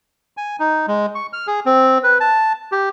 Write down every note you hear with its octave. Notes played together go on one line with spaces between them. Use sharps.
G#5
D#4
G#3
C#6
F6
G#4
C4
B4
A5
G4